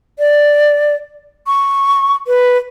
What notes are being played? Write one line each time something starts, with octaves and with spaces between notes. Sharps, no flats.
D5
C#6
B4